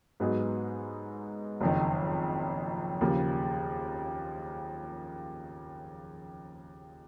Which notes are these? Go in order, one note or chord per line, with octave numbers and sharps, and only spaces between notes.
G#2 F#3 B3 D#4 G#4
F#1 F2 D#3
D#2 C#3 F3 A#3